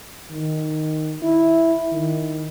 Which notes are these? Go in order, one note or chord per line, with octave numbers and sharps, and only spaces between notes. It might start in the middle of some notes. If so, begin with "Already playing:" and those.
D#3
E4
D#3